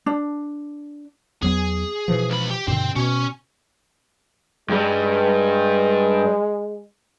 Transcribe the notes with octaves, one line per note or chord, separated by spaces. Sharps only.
D4
E2 F#3 B3 G#4
B2 E3 F3
C#2 B5
G4
G2 B2 D3 C4
B2 C#4
G2 G3 G#3